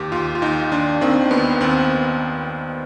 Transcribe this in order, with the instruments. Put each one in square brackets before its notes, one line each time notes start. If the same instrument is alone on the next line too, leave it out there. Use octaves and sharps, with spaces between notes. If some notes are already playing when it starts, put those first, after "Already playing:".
Already playing: [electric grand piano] D#2 G4
D#2 F4
F4
D#2 D#4
D#2 D4
D#3 C4
D#2 B3
D#2 C4